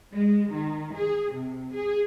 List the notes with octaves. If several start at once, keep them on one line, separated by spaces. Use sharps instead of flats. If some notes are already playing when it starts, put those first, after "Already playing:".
G#3
D#3
G#4
C3
G#4